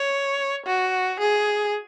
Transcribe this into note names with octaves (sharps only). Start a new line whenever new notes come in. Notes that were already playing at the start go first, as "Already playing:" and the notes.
Already playing: C#5
F#4
G#4